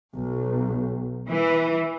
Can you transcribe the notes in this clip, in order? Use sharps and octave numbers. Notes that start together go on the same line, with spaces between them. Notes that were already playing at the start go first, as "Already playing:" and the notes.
B1
E3